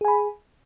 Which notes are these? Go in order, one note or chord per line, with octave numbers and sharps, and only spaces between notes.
G#4 G#5 B5